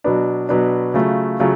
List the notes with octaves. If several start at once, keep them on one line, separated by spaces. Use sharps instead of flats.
B2 F#3 B3 D4
B2 F#3 B3 D4
C#3 F#3 A3 F4
C#3 F#3 A3 F4